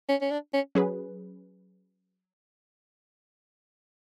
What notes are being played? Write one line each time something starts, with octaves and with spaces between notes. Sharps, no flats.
C#4
C#4
D4
C#4
F#3 C#4 G#4 B4